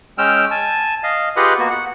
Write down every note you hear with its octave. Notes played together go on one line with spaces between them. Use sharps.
G#3 C#4 G5 E6 F6
G#5 A5
D#5 F5
F4 G4 G#4 B4 D#5 F#5
A#3 B3 F#4
F#5